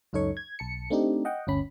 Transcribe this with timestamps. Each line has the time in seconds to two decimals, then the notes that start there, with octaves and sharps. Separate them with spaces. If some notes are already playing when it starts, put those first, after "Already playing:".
0.13 C#2 F#2 D#4 A4 C#5 C#6
0.37 G#6
0.59 B1 A5 C#7
0.90 A3 C4 D4 D#4 G4
1.25 D#5 F#5 G5
1.47 G1 D2 C#4 B5